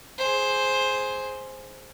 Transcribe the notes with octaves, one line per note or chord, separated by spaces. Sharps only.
G#4 C5